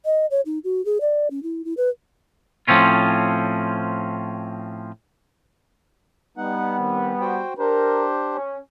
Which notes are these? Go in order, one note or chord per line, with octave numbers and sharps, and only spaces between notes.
D#5
C#5
D#4
F#4
G#4
D5
C#4
E4
E4
B4
A2 F3 C4 C#4 F4
G3 B3 D#4 F#5
D#3 C4
F#4 C5 G5
D4 G4 A#4 C5
C#4